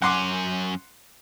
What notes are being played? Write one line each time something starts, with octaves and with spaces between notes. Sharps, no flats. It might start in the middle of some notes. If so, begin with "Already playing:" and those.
F#2 C#4 F#5 C6 D6